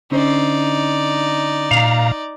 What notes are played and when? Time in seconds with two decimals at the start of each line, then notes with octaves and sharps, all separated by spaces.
0.11 D3 C#4 D#4 C5 D5
1.71 A#2 F5 A#5